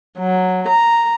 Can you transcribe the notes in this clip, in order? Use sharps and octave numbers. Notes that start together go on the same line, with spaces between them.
F#3
A#5